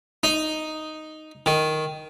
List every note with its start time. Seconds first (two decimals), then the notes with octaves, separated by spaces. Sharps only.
0.23 D#4
1.46 D#3